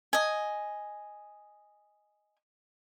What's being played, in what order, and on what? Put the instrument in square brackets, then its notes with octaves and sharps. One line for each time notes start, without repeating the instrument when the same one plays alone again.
[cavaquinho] D#5 G#5